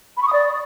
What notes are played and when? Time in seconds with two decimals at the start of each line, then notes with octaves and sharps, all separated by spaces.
0.16 B5
0.21 C#6
0.27 D#6
0.32 D5